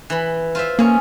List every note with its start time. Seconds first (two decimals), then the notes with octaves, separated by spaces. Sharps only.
0.10 E3 B5
0.55 F4 C5 E5
0.79 A#3 C#4 G#4